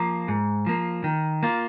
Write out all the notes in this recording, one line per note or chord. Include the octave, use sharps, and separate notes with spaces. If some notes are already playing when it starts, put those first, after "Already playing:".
Already playing: F3 A#3
G#2
F3 A#3
D#3
A#3 F4